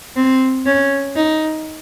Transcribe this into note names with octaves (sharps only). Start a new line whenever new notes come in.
C4
C#4
D#4